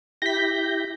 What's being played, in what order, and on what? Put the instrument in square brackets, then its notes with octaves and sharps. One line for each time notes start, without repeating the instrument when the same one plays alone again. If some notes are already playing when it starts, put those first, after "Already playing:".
[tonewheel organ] E4 G4 G6 [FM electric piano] A#6 B6